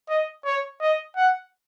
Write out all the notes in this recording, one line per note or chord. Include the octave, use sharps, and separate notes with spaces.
D#5
C#5
D#5
F#5